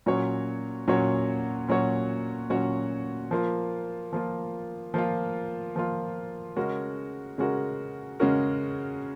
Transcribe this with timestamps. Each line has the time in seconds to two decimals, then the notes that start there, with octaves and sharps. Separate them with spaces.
0.06 A#2 F#3 C#4 F#4 C#5
0.88 A#2 F#3 C#4 F#4 C#5
1.68 A#2 F#3 C#4 F#4 C#5
2.50 A#2 F#3 C#4 F#4 C#5
3.31 F3 A#3 F4
4.13 F3 A#3 F4
4.94 F3 A#3 F4
5.76 F3 A#3 F4
6.56 C#3 G#3 C#4 F#4 A#4
7.38 C#3 G#3 C#4 F#4 A#4
8.20 C#3 G#3 C#4 F#4 A#4